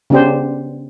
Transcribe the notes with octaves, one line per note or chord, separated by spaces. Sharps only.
C#3 B3 D4 G4 C5